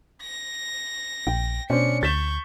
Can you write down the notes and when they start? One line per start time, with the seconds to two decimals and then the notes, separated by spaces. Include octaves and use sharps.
0.22 A#6
1.27 A#1 G5
1.70 B2 C#4 D4 C5 C#7
2.03 D2 C#6 G6 A6 B6 E7